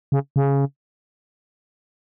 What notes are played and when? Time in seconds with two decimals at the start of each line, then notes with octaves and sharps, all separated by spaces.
0.12 C#3
0.36 C#3